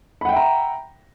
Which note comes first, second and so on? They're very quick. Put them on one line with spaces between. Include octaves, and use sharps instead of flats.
B5 F#5 G5 E5 A#5